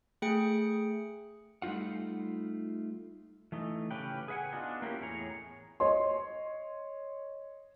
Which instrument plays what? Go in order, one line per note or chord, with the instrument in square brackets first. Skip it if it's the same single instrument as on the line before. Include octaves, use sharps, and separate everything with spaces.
[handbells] A3 G#4 G5 C#7
[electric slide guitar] G3 A3 D#4 F4 F#5
E3 A3 D#4
A2 C#3 C#4 G4 B4 G5
G#4 B4 E5 F#5 G#5
B3 D4 D#4 F4 F#4
A#3 C#4 E4 G4 A#4
E2 A2 G#4 C#5 A#5
[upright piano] C#5 D#5 C6